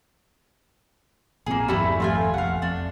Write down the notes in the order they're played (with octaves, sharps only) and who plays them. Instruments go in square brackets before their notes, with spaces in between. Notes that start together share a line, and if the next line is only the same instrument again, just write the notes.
[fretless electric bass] A#1 A#2 C4 [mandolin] A#3 G#4
[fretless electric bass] G#1 F2 [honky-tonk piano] G3 [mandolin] A3 E4
[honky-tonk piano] A3 [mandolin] C4 F4 G#5
[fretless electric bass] F1 A#1 [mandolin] F5 F#5
[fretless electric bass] F2 [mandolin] D4